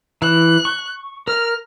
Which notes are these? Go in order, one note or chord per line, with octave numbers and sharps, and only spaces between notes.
E3 F#6
C#6
A#4 F6